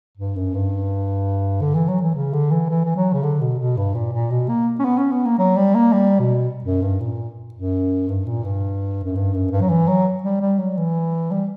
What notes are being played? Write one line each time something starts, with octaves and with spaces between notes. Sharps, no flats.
G2
F#2
G2
D3
E3
F#3
E3
C#3
D3
E3
E3
E3
F#3
C#3
D3
B2
B2
G2
A#2
A#2
B2
A#3
C#4
B3
C#4
B3
A#3
F#3
G3
A#3
G3
B2
F#2
G2
A#2
F#2
G2
A#2
G2
F#2
G2
F#2
G2
F#3
E3
F#3
G3
G3
F#3
E3
G3